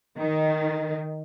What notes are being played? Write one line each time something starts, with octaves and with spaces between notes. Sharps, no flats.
D#3